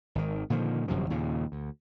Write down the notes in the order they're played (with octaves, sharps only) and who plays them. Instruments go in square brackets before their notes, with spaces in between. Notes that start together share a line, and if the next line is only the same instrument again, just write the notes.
[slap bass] G#1 D#3
A#2 D3 D#3 F3
G1 F#2 C3 F3
D#2 A#2 C#3
D2